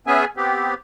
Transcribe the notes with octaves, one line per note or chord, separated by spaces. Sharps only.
B3 C#4 G#4 E5 G#5
B3 C4 G4